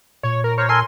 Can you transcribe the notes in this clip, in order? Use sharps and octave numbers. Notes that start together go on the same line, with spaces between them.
A#2 C#5
A#4
A#4 C5 C#5
A4 A#4 G#5 C6